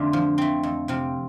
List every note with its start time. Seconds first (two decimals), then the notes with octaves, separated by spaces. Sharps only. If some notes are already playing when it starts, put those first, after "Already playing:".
Already playing: F2 D3 A3 F4
0.13 F3
0.38 A3 C4
0.63 F2
0.88 C3 F3 C4 F4